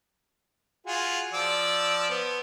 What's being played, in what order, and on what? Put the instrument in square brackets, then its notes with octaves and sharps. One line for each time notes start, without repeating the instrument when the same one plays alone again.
[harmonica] F4 F#4 G#4
F3 D5 E6
B3 C5